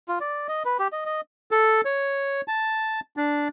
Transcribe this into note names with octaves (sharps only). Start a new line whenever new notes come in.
F4
D5
D#5
B4
G4
D#5
D#5
A4
C#5
A5
D4